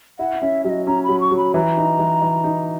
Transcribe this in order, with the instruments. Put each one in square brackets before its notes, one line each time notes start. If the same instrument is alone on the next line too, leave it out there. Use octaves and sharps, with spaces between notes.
[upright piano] E4 [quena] F#5
[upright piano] C#4 [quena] E5
[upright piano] F#3 [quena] D#5 E5
[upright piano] C#4 [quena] A#5
[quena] B5
[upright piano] F#3
[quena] C#6
[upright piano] F#3
[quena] B5
[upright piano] E3 [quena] A#5
[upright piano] D#4
E3
E3
D#4